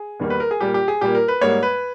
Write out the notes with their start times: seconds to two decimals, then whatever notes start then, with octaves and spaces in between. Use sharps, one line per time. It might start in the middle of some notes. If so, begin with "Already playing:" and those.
Already playing: G#4
0.20 E2 D#3 G3 A#3
0.30 B4
0.40 A#4
0.51 G#4
0.61 A#2 G3 A#3 G4
0.74 G4
0.88 G#4
1.01 A#2 G3 A#3 G4
1.15 A#4
1.28 B4
1.41 G#2 G3 A#3 C#5
1.63 B4